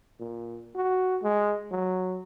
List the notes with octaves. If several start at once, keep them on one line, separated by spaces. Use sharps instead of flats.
A#2
F#4
G#3
F#3